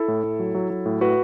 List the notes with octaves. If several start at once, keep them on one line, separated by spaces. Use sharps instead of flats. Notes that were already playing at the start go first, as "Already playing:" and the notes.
Already playing: E4 A4
A2
A2
F#3
F#3
F#3
A2
A2 F#4 B4